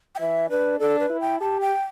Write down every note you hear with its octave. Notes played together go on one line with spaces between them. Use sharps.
G5
E3 E5
D4 B4
D4 A4
B4
E4
G5
G4 A5
G5